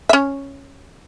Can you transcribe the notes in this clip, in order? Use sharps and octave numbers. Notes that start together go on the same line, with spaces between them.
E5
C#4 C#5